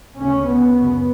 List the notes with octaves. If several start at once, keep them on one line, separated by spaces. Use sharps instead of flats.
D2 C#3 C#4
B3
F#2 C#3